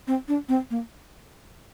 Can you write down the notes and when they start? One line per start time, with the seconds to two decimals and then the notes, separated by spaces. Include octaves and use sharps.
0.07 C4
0.28 D4
0.49 C4
0.70 A#3